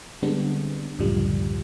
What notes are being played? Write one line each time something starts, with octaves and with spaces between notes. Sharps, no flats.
D3 G3 G#3 B3 C4 D4
C#2 F#2 A2 D3 F3 G3